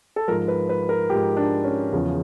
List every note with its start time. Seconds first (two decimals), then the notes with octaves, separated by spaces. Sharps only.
0.16 A4
0.28 G#2 F3 A#4
0.48 B4
0.69 B4
0.89 A#4
1.10 G#2 F3 G4
1.37 D4
1.64 C#4
1.92 E2 C#3 F3